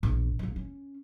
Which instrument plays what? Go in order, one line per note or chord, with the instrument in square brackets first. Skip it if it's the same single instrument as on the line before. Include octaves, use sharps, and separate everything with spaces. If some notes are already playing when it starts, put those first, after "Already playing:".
[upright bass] A#1 E2
A#1 A#3
C#4